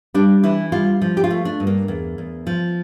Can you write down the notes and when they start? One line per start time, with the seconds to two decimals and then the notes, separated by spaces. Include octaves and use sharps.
0.14 G3 D4
0.43 E3 E4
0.72 G3 F4
1.02 F3
1.17 G4
1.24 F4
1.30 A3
1.45 D4
1.60 G2
1.67 A#3
1.88 E2
2.18 E2
2.47 F3